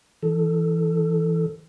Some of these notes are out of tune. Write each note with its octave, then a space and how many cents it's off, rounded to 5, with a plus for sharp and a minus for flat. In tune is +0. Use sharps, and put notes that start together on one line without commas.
E3 +0 A4 +0